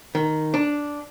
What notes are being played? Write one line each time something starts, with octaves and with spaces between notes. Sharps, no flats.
D#3
D4